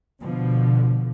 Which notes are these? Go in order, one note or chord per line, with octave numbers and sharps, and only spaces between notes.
B2 D3 F3